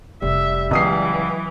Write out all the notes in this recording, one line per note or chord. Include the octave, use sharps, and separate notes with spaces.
F1 G3 E5
C#2 E3 F#3 D#6 C7